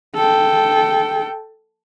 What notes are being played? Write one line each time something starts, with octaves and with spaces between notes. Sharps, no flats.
A4 G5